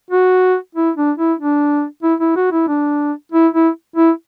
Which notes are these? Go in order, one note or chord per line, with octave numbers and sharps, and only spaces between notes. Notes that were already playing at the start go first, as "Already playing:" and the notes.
F#4
E4
D4
E4
D4
E4
E4
F#4
E4
D4
E4
E4
E4